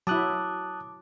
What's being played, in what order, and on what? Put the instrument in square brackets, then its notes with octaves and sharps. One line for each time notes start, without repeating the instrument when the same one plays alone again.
[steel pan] F#3 E4 [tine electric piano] A5 D#6 F#6 [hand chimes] D6